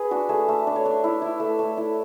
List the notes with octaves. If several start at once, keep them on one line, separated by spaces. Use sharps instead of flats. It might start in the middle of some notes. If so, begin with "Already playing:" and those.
Already playing: G#4 B4
D4 F#4
A3 G#4
A3
D4
C#5
D4
E4
E4
A3
A3
E4